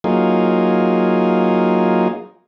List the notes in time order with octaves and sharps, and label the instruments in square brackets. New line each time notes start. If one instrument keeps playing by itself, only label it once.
[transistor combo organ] F#3 A#3 D#4 F4 G#4